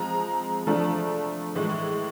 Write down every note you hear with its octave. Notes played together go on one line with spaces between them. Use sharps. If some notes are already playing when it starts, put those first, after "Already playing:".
Already playing: F3 G#3 C4 A#5
F3 A3 D4
A2 E3 G#3